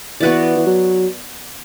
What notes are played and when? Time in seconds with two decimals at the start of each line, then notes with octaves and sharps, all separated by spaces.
0.20 E3 B3 F#4 B4 D5
0.57 E3
0.67 F#3